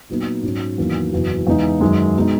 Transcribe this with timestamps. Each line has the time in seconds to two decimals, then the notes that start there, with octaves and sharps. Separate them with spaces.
0.09 A#2 F#3 B3 D#4
0.43 G#2 F#3 C#4
0.78 E2 D#3 F#3 A#3
1.12 F#1 E2 B2 F#3
1.47 E2 C#3 G#3 D#4
1.81 F#2 D#3 G#3
2.17 B2 G#3 D#4